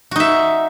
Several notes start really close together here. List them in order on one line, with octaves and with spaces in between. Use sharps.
F#4 D#4 E5